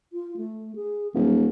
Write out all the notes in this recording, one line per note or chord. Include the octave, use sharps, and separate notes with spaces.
F4
A3
G#4
D#1 F#3